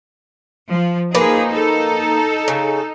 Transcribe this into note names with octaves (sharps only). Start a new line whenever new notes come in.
F3
F3 A#3 D#4 G#4 B4
A4
C#3